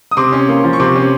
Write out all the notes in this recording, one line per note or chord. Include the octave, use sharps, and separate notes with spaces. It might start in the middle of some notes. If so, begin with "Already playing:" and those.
D#6
C3 C6 D6
C#4
A#3
F3
C#6
C3 C6 D6
C#4